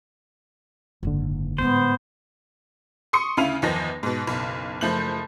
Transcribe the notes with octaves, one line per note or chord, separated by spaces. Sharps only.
F#1 B1 G#2 D3
A2 G#3 B3 C5
C6 C#6 D#6 C#7
D2 C#3 E4 F5 D#7 F7
G1 E2 D#3 F3 D#4 A#6
G#2 B2
F#1 B1
F#1 F3 A3 G6 F#7